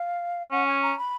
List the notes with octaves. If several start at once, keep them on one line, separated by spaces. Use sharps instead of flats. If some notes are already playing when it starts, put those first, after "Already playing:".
Already playing: F5
C#4 F#5
G#5
A#5
B5